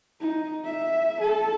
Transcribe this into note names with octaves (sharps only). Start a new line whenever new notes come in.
D#4
E5
A4